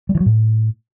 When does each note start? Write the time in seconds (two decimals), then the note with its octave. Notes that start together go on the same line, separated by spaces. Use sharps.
0.09 G3
0.15 E3
0.20 F#3
0.26 A2